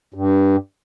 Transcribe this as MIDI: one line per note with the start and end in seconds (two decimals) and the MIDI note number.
0.14 0.56 43